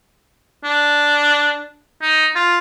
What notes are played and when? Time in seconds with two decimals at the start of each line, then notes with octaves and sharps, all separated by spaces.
0.64 D4
2.01 D#4
2.35 F4